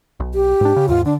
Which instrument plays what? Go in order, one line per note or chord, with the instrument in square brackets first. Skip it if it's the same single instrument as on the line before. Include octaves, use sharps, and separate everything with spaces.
[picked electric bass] B1
[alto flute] G4
[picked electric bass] G#2 D4
C#3
[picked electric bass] D#2 G#2 [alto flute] F4
[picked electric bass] D3 [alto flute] D4